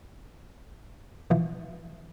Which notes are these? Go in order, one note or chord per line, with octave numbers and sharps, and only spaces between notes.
B2 E3 F3